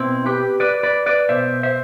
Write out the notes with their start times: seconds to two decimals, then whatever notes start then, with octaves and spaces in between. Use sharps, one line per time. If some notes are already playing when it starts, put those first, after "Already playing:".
Already playing: B2 C4 E4
0.26 G4 B4
0.60 B4 D5
0.83 B4 D5
1.06 B4 D5
1.29 B2 C5 E5
1.63 C5 E5